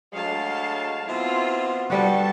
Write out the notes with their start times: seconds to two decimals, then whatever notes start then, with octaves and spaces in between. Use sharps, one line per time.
0.13 D2 F#3 G#3 F5 A5
1.08 B2 C4 E4 F4
1.90 G2 G3 B3 F#4 A4 A5 C#6